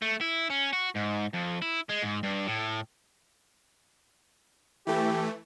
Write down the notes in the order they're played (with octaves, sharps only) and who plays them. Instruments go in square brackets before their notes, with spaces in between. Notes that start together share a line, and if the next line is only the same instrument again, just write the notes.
[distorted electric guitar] A3
E4
C#4
F#4
G#2
F2
E4
G#3
G#2
G2
A2
[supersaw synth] E3 A3 [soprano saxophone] G4